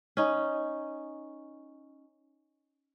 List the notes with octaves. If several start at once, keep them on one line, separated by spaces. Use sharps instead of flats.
C#4 D#4